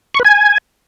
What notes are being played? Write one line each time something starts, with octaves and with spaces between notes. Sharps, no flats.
C#6
B4
G#5